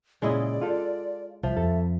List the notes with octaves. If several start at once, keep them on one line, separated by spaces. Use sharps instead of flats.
A#2 C#3 G#3 E4 D5 D#5
F4 A4
C2 F3 E5
F2 A4